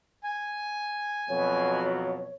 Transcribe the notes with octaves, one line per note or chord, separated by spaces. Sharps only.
G#5
F2 B2 F#3 C#5